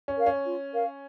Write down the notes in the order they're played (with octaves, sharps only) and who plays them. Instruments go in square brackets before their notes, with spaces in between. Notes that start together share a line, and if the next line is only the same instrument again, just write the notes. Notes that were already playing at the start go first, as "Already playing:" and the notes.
[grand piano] C#4
[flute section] A#4 C#5 F5
[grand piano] C#4
[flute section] F4
A#4 C#5 F5